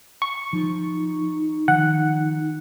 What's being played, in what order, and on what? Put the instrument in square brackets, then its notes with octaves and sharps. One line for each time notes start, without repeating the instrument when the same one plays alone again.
[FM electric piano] C#6
[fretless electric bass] F3 [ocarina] D#4
[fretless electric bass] D#3 F3 [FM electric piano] F#5